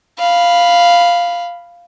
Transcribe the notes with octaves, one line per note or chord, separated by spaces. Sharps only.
F5 B5